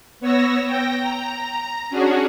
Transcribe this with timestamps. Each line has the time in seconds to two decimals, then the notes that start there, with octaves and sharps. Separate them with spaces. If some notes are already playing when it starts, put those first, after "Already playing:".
0.20 B3 C#5 E6 A#6
0.66 G5 A#6
1.01 A#5
1.90 C#4 D4 F#4 G#4